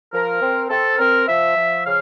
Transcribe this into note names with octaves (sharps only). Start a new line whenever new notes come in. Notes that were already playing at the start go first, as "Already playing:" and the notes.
F3 A#4
C4
C4 A4
C4 A#4
F3 E5
F3
C#3 F5